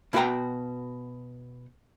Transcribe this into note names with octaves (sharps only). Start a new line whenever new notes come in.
B2 E4 F#4 A4 G5 A#5